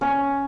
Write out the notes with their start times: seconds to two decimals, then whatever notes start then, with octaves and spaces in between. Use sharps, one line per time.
0.01 C#4